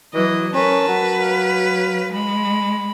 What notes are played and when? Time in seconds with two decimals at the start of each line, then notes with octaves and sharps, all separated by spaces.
0.14 E3 F#3 D#5
0.54 C#4 A#4 B4 A5
0.88 F#3
1.22 F5
2.13 G#3 B5